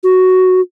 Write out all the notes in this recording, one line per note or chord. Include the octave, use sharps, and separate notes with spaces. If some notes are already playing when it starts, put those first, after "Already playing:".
F#4